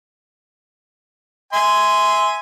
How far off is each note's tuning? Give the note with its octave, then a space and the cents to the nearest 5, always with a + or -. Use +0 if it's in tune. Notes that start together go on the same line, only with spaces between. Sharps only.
E5 -20 G#5 +0 C6 -15